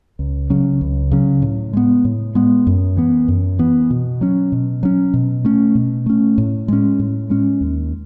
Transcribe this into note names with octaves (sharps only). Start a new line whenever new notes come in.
C#2
C#3 F#3 C#4
C#2
C#3 F#3 C#4
A2
G#3 B3
A2
G#3 B3
F#2
E3 B3
F#2
E3 B3
B2
F#3 C#4
B2
F#3 C#4
B2
A3 C#4
B2
A3 C#4
A2
G#3 C#4
A2
G#3 C#4
D#2